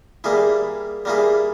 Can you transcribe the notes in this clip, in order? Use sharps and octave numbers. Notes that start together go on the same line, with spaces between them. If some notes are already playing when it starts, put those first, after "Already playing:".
G3 A#3 E4 G#4
G3 A#3 E4 G#4